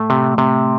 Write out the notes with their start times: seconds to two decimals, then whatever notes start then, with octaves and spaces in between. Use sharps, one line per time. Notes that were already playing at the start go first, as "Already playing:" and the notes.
Already playing: A2 A3
0.10 C3
0.38 C3